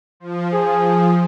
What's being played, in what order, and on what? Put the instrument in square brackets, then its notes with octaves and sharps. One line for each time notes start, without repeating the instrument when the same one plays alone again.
[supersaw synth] F3
[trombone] G#4